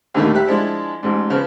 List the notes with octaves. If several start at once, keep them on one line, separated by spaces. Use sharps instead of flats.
D#2 A#2 D3 D#3 G3 A3
G3 G4 E5 F#6
F3 G#3 D4 E4
A1 G#2
C#3 F3 B3